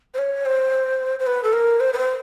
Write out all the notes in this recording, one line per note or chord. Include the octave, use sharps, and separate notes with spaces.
C5
C#5
C5
C5
B4
A4
A#4
C5
B4
C5